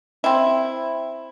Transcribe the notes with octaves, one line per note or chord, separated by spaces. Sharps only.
C4 E4